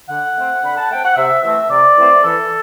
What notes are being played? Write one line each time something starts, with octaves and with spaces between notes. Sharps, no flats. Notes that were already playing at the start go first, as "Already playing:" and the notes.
D3 F#5
A3 C4
D3 B5
A5
A3 C4 G5
F#5
C3 E5
E3 A3 C4 E5
C3 D5
E3 A3 C4
E3 A4